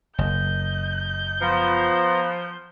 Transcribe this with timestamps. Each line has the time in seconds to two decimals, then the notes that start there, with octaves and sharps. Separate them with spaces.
0.18 F#1 D#5 G6
1.41 F3 B3 C5 A#5